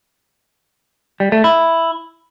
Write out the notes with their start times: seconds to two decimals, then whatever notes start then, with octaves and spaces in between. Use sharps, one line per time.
1.20 G3
1.32 A3
1.44 E4